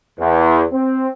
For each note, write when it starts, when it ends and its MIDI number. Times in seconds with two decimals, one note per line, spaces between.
0.19 0.63 40
0.73 1.07 60